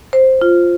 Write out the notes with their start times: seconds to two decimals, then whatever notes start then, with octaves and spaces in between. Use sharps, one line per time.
0.13 C5
0.42 F4